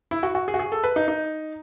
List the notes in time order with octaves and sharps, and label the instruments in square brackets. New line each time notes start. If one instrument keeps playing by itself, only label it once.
[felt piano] E4
F#4
F#4
G#4
F#4
G#4
A4
B4
D#4
D#4